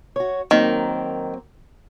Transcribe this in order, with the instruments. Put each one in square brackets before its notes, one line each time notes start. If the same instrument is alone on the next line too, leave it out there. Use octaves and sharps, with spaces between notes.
[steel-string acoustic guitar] F#4 C#5
[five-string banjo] D#3 [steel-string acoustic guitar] F#3 A#3 C4